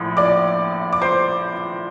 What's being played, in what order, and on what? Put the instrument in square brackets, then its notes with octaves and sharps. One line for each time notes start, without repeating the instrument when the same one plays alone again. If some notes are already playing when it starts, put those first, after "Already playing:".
Already playing: [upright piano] A#1 A2 F3
D5 D6
D6
C5 C6